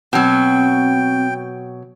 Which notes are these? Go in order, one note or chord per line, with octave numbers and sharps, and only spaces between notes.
B2 F#3 C4 G5